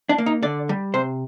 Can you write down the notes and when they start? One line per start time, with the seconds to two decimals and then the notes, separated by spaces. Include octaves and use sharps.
0.09 D4
0.18 A#3
0.26 D#4
0.43 D3 D5
0.69 G3
0.94 C3 C5